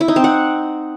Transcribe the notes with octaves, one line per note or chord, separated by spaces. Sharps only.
E4
D#4
C4
F#5